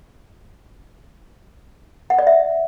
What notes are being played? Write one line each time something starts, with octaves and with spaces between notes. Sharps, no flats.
F#5
D5
E5